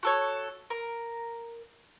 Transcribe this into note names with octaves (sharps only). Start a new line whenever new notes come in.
F#4 A4 C#5
A#4